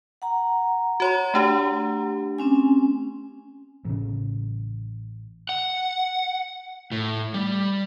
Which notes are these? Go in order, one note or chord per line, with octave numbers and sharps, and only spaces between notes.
F#5 A#5
F#4 C#5 C6
A3 D4 G4
C4 C#4 G#5
A1 C#3
F#5
A2
G3